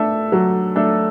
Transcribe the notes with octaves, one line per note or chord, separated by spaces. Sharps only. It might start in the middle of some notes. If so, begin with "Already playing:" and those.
Already playing: A3 D4 A4 E5
F#3
A3 D4 A4 E5